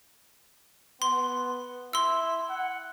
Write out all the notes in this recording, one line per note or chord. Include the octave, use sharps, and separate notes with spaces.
B3 C6
E4 C6 E6
F#5